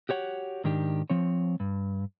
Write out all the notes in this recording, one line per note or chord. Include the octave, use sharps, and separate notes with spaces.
F#4 G4 C#5 F#5
G#2 D#3 D4 G4
F3 C4 C#5
G2